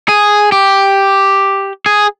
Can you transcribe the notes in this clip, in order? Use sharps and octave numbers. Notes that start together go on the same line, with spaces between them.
G#4
G4
G#4